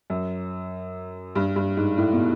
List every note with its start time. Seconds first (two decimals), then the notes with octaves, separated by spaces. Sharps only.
0.10 F#2
1.35 G2
1.56 G2
1.77 G#2
1.98 A2
2.13 B2